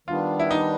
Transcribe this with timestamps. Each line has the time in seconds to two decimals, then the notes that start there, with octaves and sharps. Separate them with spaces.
0.08 D#3 G3 B3 D4 F4
0.39 E4
0.51 D#4